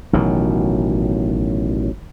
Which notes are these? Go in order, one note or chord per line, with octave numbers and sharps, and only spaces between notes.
A1 B2 D#3 F#3